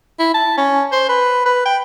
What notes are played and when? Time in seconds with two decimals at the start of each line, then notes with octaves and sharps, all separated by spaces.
0.19 E4
0.34 A5
0.57 C#4
0.93 C5
1.09 B4
1.46 B4
1.65 G5